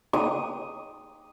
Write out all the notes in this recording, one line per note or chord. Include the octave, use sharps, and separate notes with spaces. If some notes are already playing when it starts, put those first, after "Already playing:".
D#6